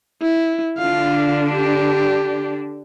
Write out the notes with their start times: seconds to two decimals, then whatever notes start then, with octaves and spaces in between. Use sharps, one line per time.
0.22 E4
0.78 D3 D4 F4 F5
1.53 G4